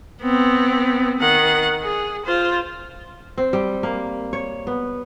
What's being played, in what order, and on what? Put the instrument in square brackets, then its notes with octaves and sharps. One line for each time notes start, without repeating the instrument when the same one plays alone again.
[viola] B3 C4
D#3 F#5
G#4
F4 C5
[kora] C4
G3
A#3
C#5
B3